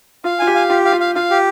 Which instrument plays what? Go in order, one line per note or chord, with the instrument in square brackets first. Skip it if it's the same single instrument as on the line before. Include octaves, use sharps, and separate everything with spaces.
[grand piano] F4 [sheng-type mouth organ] F5
[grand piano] F4 [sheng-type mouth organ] G#5
[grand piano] G4
[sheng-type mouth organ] F5
[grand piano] F4 [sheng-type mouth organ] G4
[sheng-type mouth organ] F5
[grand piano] F4
[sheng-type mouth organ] F5
[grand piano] F4 [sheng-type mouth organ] F5
[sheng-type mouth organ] G4